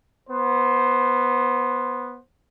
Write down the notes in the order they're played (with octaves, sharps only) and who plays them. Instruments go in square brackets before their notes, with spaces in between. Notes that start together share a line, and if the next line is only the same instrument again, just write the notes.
[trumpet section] B3 C5